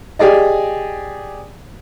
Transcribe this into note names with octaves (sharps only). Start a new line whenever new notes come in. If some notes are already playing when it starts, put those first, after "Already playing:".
G4 G#4 D5 D#5